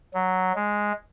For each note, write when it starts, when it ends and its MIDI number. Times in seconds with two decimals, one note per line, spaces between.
0.14 0.53 54
0.55 0.92 56